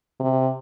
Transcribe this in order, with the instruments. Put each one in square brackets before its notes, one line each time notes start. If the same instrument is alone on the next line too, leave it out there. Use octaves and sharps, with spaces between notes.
[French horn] C3